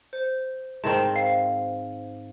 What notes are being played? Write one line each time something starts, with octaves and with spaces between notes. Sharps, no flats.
C5
G#2 D#3 C4 A5
F5